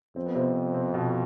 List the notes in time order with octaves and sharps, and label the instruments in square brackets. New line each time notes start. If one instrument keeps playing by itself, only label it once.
[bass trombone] F2 [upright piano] C4
[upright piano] B3
C3 C4
C3 C4
B2 B3